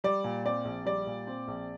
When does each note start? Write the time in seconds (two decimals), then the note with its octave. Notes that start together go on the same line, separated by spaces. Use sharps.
0.04 G3 D5
0.24 A#2
0.45 C4 D5
0.65 A#1
0.85 G3 D5
1.07 A#2
1.27 C4
1.48 A#1